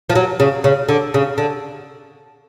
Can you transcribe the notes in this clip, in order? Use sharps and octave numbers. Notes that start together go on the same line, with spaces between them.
F3
F#3
C#3
C#3
D3
C#3
D3